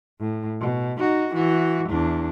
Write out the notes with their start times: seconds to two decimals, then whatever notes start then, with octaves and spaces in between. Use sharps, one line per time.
0.20 A2
0.60 B2
0.99 D#4 F#4
1.34 E3 F#4
1.90 E2 D4